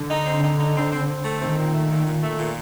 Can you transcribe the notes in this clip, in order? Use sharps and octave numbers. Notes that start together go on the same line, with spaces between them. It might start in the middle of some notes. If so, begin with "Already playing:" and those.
Already playing: D3
D#4
C4
D#4
D#4
C4
C4
C4
A3
D#3 C4
A#2
A3
A#2
A#2
A3
A#2